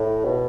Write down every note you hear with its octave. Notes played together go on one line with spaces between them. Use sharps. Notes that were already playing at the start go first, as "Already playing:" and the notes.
Already playing: A2
B2